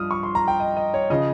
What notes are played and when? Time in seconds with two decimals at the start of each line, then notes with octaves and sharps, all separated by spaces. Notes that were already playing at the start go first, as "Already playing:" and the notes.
Already playing: G2 F3 D#6 F6
0.11 C#6
0.23 C6
0.35 A#5
0.48 G5
0.60 D#5
0.77 D#5
0.94 C#5
1.10 C#3 F3 D#5